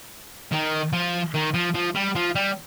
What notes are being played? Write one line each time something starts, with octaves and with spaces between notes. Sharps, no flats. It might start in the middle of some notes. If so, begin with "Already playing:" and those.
D#3
F3
D#3
F3
F3
G3
F3
G3